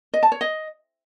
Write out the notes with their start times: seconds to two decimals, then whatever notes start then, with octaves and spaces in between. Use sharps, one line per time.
0.14 D#5
0.23 A5
0.32 C#5
0.41 D#5